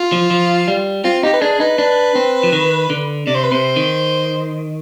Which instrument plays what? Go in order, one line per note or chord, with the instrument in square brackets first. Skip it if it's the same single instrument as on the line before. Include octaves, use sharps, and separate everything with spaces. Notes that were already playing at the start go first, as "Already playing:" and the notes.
Already playing: [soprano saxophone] F4
[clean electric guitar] F3
F3
G3
[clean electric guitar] C4 [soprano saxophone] F4
[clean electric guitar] D#4 [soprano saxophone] G4
[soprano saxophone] B4
[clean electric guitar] D4 [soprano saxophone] G#4
[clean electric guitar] D#4 [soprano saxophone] B4
[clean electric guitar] D4
C4
F3
D#3
D3
[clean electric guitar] C3 [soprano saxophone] D5
[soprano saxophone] C5
B4
[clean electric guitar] C3 [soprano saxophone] C5
[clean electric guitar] D#3